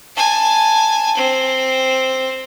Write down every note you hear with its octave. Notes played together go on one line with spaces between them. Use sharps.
G#5 A5
C4